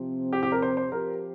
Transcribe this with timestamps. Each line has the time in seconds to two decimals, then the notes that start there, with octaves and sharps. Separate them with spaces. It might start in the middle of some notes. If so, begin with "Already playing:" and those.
Already playing: C3 F3 C4
0.33 G4
0.43 G4
0.52 A#4
0.62 C5
0.77 C5
0.92 F3 C4 G4 A#4